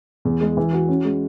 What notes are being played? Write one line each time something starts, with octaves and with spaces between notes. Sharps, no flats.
E2
G#3
E3
F#4
C#4
G#3